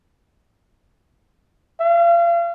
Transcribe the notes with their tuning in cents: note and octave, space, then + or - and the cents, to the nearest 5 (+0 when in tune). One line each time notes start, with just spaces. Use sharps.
F5 -35